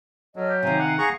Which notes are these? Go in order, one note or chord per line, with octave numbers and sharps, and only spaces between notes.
F#3 A4 D#5 F6
G4
C3 D#3 F5 G#5 A#5
F#5
G#4 F5 A#5 C#6